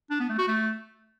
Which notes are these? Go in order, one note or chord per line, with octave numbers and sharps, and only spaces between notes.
D4
B3
A3
F#4
A3